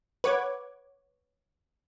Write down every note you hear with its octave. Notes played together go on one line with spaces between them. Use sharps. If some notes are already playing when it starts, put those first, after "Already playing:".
B4 C#5 F#5 D6 G#6